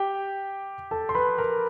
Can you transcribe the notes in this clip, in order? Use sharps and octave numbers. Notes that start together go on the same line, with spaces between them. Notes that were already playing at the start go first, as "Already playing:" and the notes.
Already playing: G4 G5
A4 A5
C6
B4 B5
A#4 A#5